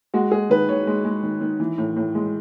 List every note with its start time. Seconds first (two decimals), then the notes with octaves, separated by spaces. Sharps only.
0.14 G#3 F#4
0.31 G#3 G#4
0.50 D#3 B4
0.69 D#3 C#5
0.87 G#3
1.05 G#3
1.23 D#3
1.41 D#3
1.60 E3
1.78 A2
1.96 A2
2.15 G#3